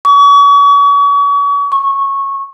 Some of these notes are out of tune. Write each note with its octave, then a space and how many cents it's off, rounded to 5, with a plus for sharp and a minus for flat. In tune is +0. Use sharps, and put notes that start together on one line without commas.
C#6 +40
C#6 -15